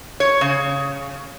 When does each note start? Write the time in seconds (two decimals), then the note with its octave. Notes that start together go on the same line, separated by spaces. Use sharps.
0.20 C#5
0.41 C#3